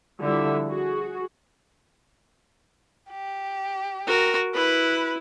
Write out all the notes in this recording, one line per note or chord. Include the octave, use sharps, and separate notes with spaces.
D3 F3 G3 E4 E5
F#4 G#4
G4
F#4 A#4
E4 B4